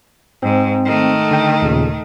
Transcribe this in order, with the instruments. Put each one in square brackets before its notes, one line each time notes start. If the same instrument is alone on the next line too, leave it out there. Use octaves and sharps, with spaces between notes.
[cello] G#2 [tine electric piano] C4
[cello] D#3 A3
[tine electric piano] D3 G5
D#2 A#2 C#3